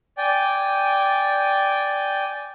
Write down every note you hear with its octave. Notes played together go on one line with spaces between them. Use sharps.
D5 G5 G#5